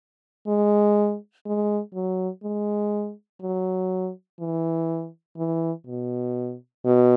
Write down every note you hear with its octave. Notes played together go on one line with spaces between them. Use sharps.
G#3
G#3
F#3
G#3
F#3
E3
E3
B2
B2